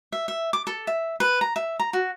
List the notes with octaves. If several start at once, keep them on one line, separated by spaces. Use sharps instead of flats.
E5
E5
D6
A4
E5
B4
A#5
E5
A#5
F#4